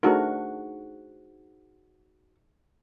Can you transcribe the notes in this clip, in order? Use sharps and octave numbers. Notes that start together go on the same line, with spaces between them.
A3 D4 D#4 F#4 G#4 A#4 C5